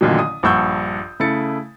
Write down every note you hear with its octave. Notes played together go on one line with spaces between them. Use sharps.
A1 A#2 D3 D#3 F#3
D#6
A#1 G2 F#5 C#6 E6 G6
C#3 A3 E4 A6 C#7